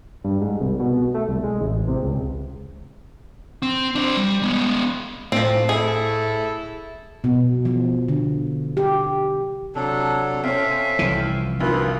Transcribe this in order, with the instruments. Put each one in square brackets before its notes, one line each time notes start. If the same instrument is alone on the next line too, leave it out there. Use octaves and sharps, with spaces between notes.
[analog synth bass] G2
G#2
C2
B2
A3
C2
G#3
A1
C3
C#2
[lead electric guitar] C4
D4 C5
G3
G#3 B3
[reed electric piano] A2 [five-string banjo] F3 C4
[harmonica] E4 A4 [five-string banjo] G#4
[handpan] B2
F3
D3
G4
[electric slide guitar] C3 [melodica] F#3 D4 A4
[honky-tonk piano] C4 C#4 [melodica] A4 E5 F5
[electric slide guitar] G#5
[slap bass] C2 E3 [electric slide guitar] F3 G5
[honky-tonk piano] D2 F3 [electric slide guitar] D#4 A#4 [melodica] F4 B4